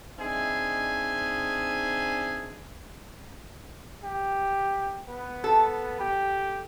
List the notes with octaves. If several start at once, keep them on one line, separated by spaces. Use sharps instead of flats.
C4 D4 D#4 G#4 E5 G#5
G4
B3
A4
G4